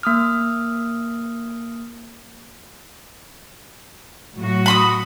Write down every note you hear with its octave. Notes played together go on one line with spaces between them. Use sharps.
A#3 D#6 F6
A2 F#3 F#4
B5 C6 D#6